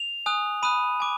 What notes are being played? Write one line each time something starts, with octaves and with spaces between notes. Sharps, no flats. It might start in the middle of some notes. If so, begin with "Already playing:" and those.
Already playing: F7
G#5 D#6 F#6
B5 D#6 F#6 D#7
G#5 D6